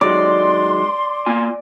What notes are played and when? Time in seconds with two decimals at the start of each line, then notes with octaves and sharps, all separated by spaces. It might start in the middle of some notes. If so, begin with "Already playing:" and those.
0.01 D#3 F#3 G#3 D5 C6
1.26 A#3 F4 G#5